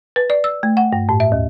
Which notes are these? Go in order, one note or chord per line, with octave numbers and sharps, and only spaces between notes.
B4
D5
E6
A3
F#5
G2
A2
E5
D#2